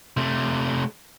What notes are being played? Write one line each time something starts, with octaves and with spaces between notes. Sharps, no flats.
C3 A3